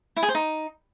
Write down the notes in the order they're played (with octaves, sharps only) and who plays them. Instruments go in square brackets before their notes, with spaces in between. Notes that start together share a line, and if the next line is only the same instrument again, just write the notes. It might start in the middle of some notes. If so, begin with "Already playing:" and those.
[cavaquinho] E4
G#4
C5
D#4